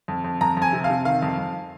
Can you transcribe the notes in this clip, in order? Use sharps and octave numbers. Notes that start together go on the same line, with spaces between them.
F2
F2
F2 A#5
F2 G#5
C3
F5
C3
D#3 F5
F2
F2